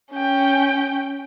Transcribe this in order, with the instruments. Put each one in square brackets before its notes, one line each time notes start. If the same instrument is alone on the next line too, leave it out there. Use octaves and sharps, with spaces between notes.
[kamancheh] C#4 G5